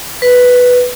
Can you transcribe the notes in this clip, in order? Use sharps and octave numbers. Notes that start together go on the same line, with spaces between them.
B4